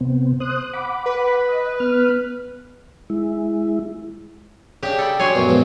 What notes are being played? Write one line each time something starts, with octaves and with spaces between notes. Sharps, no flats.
C3 B3 C4
C5 D#6 F#6
F#5 B5 D6
B4
D#5
B3 F6
G#3 E4
C#3 D4 G4
A4 G5 B5
F#3 D4 C#5 G#5 C6
A#1 F#2 B2
A#1 G#2 B2